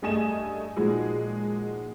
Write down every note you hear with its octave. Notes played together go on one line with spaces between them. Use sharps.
G2 A3 G#4 D#5 G#5 E7
A#2 F3 G#3 D#4 F#4 G#4